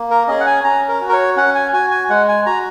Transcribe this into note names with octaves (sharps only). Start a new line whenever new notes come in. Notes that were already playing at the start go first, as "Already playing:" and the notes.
Already playing: A#3
A#4
C#4 G#4 D#5
F#5
G#5
C#4 A#5
A#4
F#4
A#4
C#5
C#4 F#5
G#5
F#4 G#5
G#5
G#3 F#5
G#5
F#4 A#5